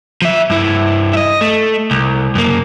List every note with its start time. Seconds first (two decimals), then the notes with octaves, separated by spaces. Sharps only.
0.22 F3 E5
0.50 G2 E4
1.13 D#5 E5
1.41 A3
1.91 C2
2.35 F#2 A#3